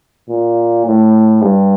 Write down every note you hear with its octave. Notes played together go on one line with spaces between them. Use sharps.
A#2
A2
G2